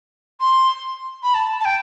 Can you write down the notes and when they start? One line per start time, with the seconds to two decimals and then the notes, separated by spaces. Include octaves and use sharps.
0.40 C6
1.23 B5
1.34 A5
1.60 A5
1.65 G5